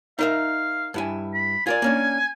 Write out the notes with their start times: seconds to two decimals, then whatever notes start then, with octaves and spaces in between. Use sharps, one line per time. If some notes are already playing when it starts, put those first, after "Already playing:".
0.19 D#4 A#4 E5 F5
0.94 G2 E4 G#5
1.34 B5
1.67 F4 A#4 D5 G#5
1.82 A#3 C#4 D4